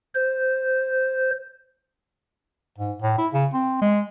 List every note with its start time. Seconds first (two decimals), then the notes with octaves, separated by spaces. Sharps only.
0.14 C5
2.78 G#2
3.02 A2
3.18 E4
3.33 C#3
3.53 C4
3.81 G#3